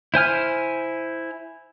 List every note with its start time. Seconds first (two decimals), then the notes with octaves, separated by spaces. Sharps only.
0.14 E4 C5 G#5 F6